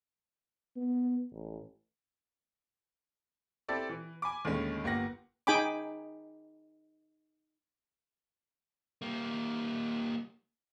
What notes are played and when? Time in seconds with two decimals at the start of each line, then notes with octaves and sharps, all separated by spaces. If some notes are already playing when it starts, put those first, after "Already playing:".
0.76 B3
1.32 A1
3.68 C4 E4 G4 A4 D5
3.89 E3
4.22 G#5 B5 D6
4.45 D#2 A2 D3 D#3 G#3 C#4
4.84 G1 A#3 G4 F#5 A#6
5.47 D#4 G#4 G5 G#5 B5 D6
9.02 G3 A#3